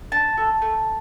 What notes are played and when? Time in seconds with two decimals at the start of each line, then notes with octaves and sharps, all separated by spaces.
0.12 D4 A5
0.37 F#4 A4
0.62 A3